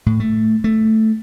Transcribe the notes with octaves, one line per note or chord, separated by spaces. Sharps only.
A2
A3
A3